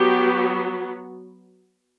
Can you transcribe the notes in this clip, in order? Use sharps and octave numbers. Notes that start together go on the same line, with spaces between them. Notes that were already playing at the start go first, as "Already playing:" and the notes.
Already playing: F#3 B3 G4